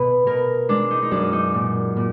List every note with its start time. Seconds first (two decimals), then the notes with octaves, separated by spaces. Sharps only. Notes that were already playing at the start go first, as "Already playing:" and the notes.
Already playing: B2 B4
0.26 B2 A#4
0.69 G#3 D4
0.91 D#4
1.02 D#4
1.11 F#2 D4
1.33 D#4
1.54 A#2
1.97 A#2